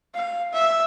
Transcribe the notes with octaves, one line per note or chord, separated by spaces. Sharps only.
F5
E5